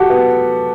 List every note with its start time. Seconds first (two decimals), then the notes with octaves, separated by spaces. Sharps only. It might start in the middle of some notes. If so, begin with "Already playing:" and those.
Already playing: F#4 G4 A4
0.10 B3